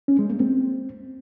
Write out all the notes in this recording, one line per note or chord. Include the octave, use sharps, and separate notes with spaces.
C#4
G#3
A#3
C4